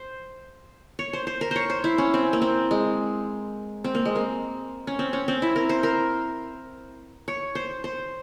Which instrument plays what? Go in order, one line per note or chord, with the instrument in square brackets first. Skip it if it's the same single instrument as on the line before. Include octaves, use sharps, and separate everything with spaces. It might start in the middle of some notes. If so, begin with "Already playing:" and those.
Already playing: [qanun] C5
C#5
C5
C5
A#4
C5 C#5
C5
E4
C#4
C4
A#3
C4
G#3
C4
A#3
G#3
A#3
C#4
C4
C#4
C4
E4
A#4
C5
A#4
C#5
C5
C5